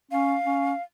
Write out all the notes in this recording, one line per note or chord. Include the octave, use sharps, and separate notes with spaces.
C#4 F5
C#4